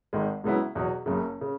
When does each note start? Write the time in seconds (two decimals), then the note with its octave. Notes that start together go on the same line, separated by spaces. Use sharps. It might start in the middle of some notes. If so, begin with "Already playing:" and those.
0.13 G#1 G#2 D#3 G#3
0.44 C#2 C#3 F#3 B3 E4
0.75 E2 B2 F#3
1.06 F#1 F#2 C#3
1.41 C#3